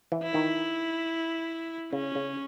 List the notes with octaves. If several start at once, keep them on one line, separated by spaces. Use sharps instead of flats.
E3
E4
D#3
C#3 C#4
C#3